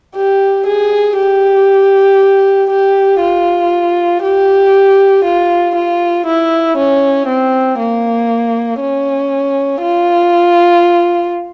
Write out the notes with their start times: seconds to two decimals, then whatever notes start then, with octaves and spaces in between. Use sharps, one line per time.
0.16 G4
0.67 G#4
1.17 G4
2.70 G4
3.21 F4
4.23 G4
5.24 F4
5.75 F4
6.26 E4
6.78 C#4
7.28 C4
7.79 A#3
8.81 C#4
9.82 F4